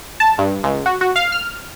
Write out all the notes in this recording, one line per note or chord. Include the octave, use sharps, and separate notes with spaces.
A5
G2
C#2
F#4
F#4
F5
F6